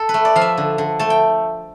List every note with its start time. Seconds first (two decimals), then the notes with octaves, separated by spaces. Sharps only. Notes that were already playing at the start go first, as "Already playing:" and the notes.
Already playing: A4
0.09 B4
0.14 A3
0.25 D5
0.36 F3 F5
0.41 E5
0.58 D3
0.78 D3
0.99 A3 A5
1.10 G5